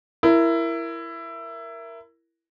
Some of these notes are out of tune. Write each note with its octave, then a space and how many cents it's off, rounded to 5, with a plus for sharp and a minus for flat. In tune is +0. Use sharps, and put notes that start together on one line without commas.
E4 +15 A#4 +0